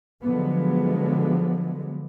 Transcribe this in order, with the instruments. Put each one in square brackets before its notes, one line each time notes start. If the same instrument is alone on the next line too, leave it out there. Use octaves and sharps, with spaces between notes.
[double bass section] D3 F3 F#3 G#3 B3